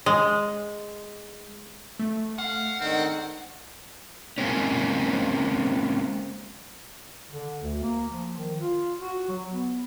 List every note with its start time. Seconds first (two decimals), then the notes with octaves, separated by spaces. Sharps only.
0.06 G#3
1.99 A3
2.38 F5 F#5
2.80 G#2 D3 D#3 C4
4.38 G#3 A#3 C4 C#4
7.31 D3
7.62 D2
7.83 A#3
8.11 F3
8.38 D#3
8.60 F4
8.99 F#4
9.29 F#3
9.52 B3